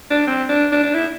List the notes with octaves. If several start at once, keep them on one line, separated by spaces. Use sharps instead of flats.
D4
C4
D4
D4
D4
E4